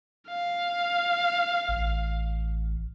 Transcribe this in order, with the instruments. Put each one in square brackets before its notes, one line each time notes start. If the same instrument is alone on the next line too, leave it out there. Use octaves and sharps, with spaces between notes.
[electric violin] F5
[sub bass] A1